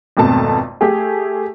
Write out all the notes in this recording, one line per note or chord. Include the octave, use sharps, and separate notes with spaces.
G#1 F2 B2 A3 A5
A3 G4 G#4